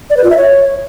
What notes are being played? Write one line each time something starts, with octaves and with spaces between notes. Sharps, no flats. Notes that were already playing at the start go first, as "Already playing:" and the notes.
D5
B4
F4
E5
C#5